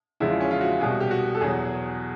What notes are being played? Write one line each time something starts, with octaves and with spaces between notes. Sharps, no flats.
E2 C#3 F3 G#3 E4
F4
C#4
F4
F#4
C2 B2 G3 G#4
F#4
G4
F#4
A4
E2 B2 F#3 G#4